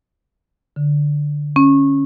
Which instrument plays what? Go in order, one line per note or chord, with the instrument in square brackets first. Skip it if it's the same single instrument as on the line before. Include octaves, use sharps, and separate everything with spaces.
[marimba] D3
C#4